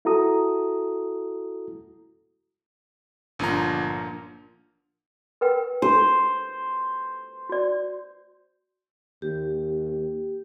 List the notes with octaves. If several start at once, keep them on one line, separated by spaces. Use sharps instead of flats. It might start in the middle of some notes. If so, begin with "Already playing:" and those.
E4 F#4 A4 A#5 D#6
G1 A#2 D3 F3 A#5
A#4 B4 G5
C5
F#4 D5
D#2 G4